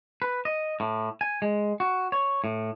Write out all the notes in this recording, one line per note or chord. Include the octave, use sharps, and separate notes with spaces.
B4
D#5
A2
G#5
G#3
F#4
C#5
A2